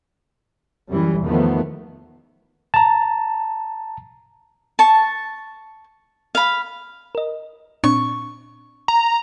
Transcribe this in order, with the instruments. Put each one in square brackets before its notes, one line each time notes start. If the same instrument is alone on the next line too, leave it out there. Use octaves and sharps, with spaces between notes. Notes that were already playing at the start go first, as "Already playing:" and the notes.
[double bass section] F#2 E3 G3
E2 D#3 F3 A3 B3
[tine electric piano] A5 A#5
[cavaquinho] A5 C#6
F5 B5
[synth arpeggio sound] A#4 D#5
[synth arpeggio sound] A#2 C4 D4 [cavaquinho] C#6
[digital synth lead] A#5